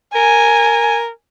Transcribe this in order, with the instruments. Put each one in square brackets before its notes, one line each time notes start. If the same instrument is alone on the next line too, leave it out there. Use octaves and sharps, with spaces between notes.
[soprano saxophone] A#4 [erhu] G#5